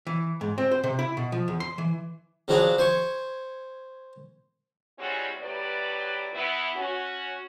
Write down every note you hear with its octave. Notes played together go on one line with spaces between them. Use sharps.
E3
G#2
C4
C5
C3
E4
B2
F3
E2
C6
E3
C#3 F3 F#3 D4 G#4
C5 G#5 C#6
G3 G#3 C4 C#4 E4 F#4
A2 F#3 G4 B4 D5
E3 B3 E4
C#4 F#4